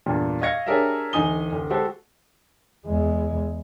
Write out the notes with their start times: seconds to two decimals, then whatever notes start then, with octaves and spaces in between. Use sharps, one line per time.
0.06 E2 G2 A#2
0.41 D#5 F5 C#6 G#6 A#6 C#7
0.66 D4 G4 G#4 A#4 C#5 E5
1.13 D1 E3 D#4 G#5 D#6 G7
1.52 D1
1.70 G#3 F#4 G4 A4 C5
2.86 E2 G#3